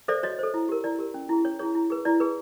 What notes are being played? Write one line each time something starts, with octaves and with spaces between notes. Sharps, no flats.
A4 C5 D5 E5
F#4 C#5 D#5
A4 C5
E4
G4 A#4
E4 D5
G4 A#4
C#4
E4 G#4
C#4 C#5
E4 G#4 C#5
E4
G#4 B4
E4 D5
G#4 B4